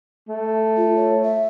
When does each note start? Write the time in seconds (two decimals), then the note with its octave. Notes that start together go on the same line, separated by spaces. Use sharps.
0.29 A3
0.77 F4
0.96 C#5
1.23 E5